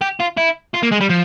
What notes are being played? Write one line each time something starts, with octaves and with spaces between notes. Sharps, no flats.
G4
F4
E4
F4
A#3
G#3
G3
F3